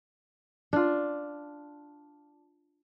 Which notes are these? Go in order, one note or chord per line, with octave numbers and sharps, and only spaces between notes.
D4 F4